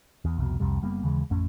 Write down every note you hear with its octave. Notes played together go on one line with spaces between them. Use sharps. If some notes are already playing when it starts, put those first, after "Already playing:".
E2
C2 F2 B2
C2 F2 C3 G3
F#1 G3 A#3 B3
D#2 C#3 E3 G#3
A1 F2 A3 C#4